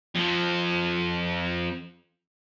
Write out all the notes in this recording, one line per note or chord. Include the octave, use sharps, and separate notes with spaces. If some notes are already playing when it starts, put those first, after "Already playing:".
F2 F3